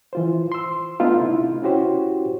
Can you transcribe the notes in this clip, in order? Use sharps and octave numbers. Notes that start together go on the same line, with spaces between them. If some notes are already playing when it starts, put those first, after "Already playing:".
E3 F4 C5
C6 E6
A3 B3 D4 D#4 F4
C3 E4
C#4 E4 F#4 G4 C5 C#5